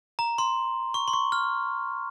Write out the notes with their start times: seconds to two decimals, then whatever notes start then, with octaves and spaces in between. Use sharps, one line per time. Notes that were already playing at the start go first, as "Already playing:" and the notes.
0.19 A#5
0.38 C6
0.94 C#6
1.08 C6
1.13 C#6
1.32 F6